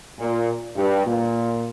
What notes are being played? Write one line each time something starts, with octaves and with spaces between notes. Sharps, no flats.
A#2
G2
A#2